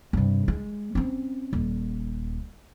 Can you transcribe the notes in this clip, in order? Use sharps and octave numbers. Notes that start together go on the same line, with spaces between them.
G2 C3
G#3
C4 C#4
D#1